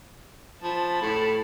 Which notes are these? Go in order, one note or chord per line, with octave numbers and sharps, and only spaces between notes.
F3 A5 B5
A2